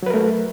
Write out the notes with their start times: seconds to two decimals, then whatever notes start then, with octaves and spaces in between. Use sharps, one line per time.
0.03 F#3
0.06 B4
0.10 A#4
0.14 A3